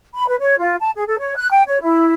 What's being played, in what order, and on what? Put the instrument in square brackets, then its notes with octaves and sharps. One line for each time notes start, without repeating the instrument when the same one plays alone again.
[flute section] B5
B4
C#5
F4
A5
G#4
A4
C#5
F#6
G5
C#5
E4